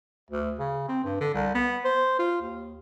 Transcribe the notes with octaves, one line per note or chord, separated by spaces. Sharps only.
D2
C#3
C4
G2
D3
C2
B3
C5
F4
D#2